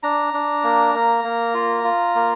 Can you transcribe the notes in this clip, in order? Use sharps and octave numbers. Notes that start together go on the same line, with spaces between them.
D4 A#5
D4
A#3
A#3
A#3
F4
F4
A#3